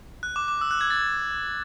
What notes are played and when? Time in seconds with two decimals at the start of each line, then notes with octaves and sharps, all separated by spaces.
0.23 F#6
0.36 D6
0.48 D6
0.61 E6
0.71 F#6
0.81 G#6
0.90 A6